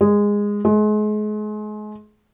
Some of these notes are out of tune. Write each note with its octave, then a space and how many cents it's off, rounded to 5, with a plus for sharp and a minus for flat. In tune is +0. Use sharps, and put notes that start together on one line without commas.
G#3 -15
G#3 +35